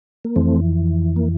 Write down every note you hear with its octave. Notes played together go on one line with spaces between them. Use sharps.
A#3
F2 E3 A3 C4
A#3